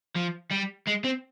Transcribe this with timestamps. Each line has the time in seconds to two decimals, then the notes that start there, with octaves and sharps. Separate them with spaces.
0.16 F3
0.51 G3
0.88 G#3
1.05 C4